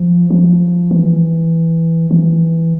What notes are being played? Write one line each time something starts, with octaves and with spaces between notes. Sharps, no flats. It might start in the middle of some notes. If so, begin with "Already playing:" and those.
Already playing: F3
F3
E3
E3